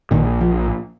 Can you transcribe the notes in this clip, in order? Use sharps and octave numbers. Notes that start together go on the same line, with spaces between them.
A#1 A#2 D#3
F3